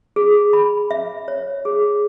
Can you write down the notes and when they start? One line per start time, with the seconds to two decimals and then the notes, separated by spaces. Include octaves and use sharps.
0.16 G#4
0.53 B5
0.91 E5
1.28 C#5
1.65 G#4